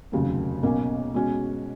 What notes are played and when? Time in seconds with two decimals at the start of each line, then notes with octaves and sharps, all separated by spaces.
0.12 F1 D#2 C#3 F#3
0.63 B1 B2 A#3 C#4
1.14 B2 G#3 C#4 F#4